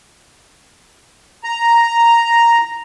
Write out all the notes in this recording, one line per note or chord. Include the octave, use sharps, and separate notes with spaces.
A#5